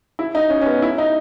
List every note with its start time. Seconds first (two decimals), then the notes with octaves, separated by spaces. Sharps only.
0.19 E4
0.35 D#4
0.50 C#4
0.61 C#4
0.66 B3
0.82 E4
0.98 D#4